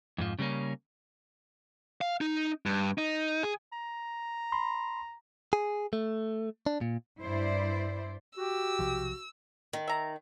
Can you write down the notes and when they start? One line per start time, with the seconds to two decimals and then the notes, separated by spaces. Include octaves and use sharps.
0.18 F2 G#2 F3
0.39 C#3 G3 A3 A#3 C#4
2.01 F5
2.21 D#4
2.66 G2
2.98 D#4
3.43 G#4
3.73 A#5
4.52 B5 C6
5.53 G#4
5.93 A3
6.66 D4
6.81 A#2
7.22 G2 E4 C5 D5
8.37 F#4 G4 E6
8.79 B1 C3 F3
9.73 D#3
9.88 E5 A#5